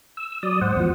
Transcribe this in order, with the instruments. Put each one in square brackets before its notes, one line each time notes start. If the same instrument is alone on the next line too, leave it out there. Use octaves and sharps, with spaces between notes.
[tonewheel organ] E6
F#3 D5 D#6
[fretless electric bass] G#2 [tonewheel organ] C5 F#5
[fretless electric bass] E2 F3